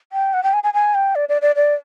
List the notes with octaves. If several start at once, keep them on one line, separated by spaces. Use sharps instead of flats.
G5
F#5
G5
G#5
G#5
G#5
G5
D5
D5
D5
D5